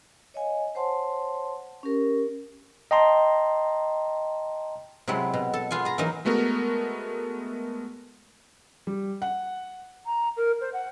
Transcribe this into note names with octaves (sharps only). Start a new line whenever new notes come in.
C#5 D#5 F5 G#5
C5 C#5 F#5 A5 C6
C#4 G4 A#4
D#5 G5 A5 A#5 C6
C3 F#3 G#3 E4
B2
A4
B3 F4 G#4 G#5
G#4 A#5
E3 F#3 A#3 D#4
G#3 A3 B3 F#4 A#4
G3
F#5
A#5
A#4
C5
F#5